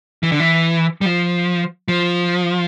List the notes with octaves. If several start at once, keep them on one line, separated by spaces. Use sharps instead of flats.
E3
D3
E3
G3
F3
F3